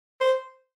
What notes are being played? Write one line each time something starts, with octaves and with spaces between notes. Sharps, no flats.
C5